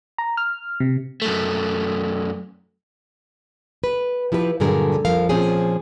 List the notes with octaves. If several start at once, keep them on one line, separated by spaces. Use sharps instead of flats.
A#5
F6
C3
F#2 A3
B4
F3 E4 G4 A#4 B4
G2 A#2 D3 F#3 G#4 A#4
F2 F3 A#4 F5
A#2 F3 C4 C#4 G#4